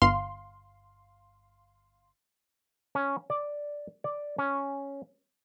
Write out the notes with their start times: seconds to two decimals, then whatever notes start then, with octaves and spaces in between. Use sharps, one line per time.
0.02 G1 F5 C6
2.95 C#4
3.30 D5
4.04 D5
4.38 C#4